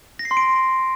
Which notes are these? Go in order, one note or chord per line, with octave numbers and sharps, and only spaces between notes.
A#6
C7
C6
D7